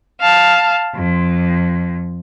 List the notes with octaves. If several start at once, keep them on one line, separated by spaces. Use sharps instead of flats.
F5 A5
F2